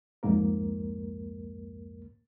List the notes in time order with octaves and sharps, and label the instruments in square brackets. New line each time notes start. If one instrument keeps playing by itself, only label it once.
[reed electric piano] C2 F2 G#2 A#3 A#4